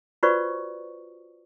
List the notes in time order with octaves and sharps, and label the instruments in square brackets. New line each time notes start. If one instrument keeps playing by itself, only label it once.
[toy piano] F4 F#4 B4 C5 D5 C#6